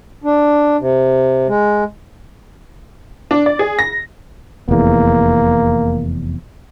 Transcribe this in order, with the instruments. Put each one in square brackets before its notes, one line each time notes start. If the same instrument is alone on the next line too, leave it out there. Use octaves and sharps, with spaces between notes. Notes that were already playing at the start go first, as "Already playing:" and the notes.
[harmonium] D4
C3
G#3
[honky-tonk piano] D4
D5
G#4
A#6
[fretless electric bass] F1 E2 [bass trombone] A#3